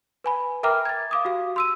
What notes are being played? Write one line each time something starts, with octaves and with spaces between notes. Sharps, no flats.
B4 G#5 B5
A#4 E5 G5 A#5 D6 F6
G#6 A6
F5 D6 D#6
F#4 G4 F5
C6 E6 D#7